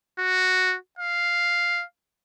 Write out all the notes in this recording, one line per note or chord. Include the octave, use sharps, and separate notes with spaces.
F#4
F5